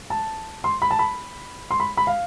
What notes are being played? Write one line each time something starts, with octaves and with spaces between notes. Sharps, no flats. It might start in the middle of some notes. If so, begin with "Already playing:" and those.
A5
C6
B5
A5
B5
C6
B5
B5
F5